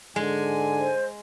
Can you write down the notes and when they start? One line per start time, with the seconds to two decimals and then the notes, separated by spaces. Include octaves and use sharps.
0.16 G#2 D3 G#3 G#5
0.80 C5